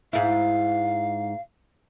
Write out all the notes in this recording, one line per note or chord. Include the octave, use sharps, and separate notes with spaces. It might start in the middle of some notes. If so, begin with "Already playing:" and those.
G#2 E4 F5